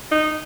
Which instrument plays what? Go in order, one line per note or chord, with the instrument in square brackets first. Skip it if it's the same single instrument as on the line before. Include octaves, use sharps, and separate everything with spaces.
[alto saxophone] D#4